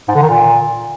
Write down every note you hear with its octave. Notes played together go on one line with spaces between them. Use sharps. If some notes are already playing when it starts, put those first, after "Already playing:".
G#2
D3
D#3
A#2